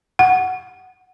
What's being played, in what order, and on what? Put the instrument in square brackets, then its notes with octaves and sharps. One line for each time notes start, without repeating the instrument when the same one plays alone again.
[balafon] F#5